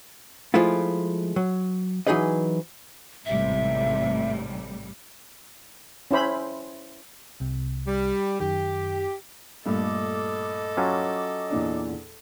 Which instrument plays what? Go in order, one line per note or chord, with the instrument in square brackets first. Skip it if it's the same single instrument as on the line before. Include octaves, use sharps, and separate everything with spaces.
[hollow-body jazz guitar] F3 G#3 A3 E4 F4
F#3
E3 F#3 D#4 G#4 B4 D#5
[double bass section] A1 C3 [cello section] G#2 G3 A3 [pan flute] E5
[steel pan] C#4 E4 C5 B5
[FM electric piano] C2 C3
[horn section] G3
[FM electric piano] F#2 D#3 [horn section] G4
[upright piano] G2 A#2 A3 [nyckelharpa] A4 [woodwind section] D#5 D6
[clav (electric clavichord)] F#3 C#4 F4
[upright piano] E2 A#2 D4